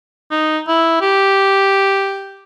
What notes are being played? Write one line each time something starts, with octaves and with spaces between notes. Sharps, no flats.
D#4
E4
G4